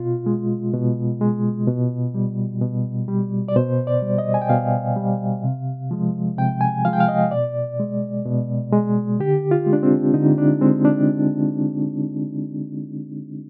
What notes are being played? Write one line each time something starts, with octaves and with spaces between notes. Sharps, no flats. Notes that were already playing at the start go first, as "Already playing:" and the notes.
Already playing: B2 F4
G#3
B2
G#3
B2
G3
B2
G3
D5
B2 C5
D5
G3
D#5
G#5
G5
B2 F5
G3
C3
F3 G#3
C3 G5
G#5
F3 G#3 F5
G5
F5
D#5
B2 D5
G#3
B2
G#3
D3 G4
F4
G#3
D4
C4
D3 D#4
D4
G#3 C4
D4